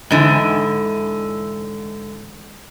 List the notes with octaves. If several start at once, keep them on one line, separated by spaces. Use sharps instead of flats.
G#2 D3 E3